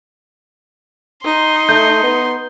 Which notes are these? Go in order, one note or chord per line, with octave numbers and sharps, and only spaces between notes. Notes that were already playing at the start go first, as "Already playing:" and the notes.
D#4 C6
A3 G6
B3